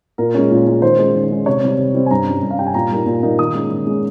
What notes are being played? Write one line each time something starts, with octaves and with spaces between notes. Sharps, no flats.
A#2 A#4
G#3 C#4
A#2
G#3 C#4
D#3 C5
G#3 C#4
D#3
G#3 C#4
C3 C#5
G3 C4
C3
G3 C4
G#5
G2 A#5
G3 C#4
G2
F5
G3 C#4 G5
G#5
A#2 A#5
G3 A#3 D#4
A#2
G3 A#3 D#4
D#3 D#6
G#3 C#4
D#3
G#3 C#4